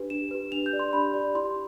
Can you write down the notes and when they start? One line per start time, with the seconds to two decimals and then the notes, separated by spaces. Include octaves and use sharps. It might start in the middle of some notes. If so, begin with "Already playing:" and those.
Already playing: D4 G4 B4
0.10 D4 E7
0.31 G4 B4
0.52 D4 F7
0.66 G6
0.73 G4 D5
0.79 C6
0.93 D4 B5
1.14 G4 D5
1.35 E4 C6